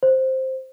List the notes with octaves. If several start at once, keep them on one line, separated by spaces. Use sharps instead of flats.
C5